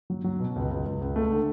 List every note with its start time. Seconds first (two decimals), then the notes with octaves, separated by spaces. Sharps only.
0.10 F#3
0.24 F#3
0.40 B2
0.56 C#2
0.71 C#2
0.86 C#2
1.01 C#2
1.16 A3
1.31 D3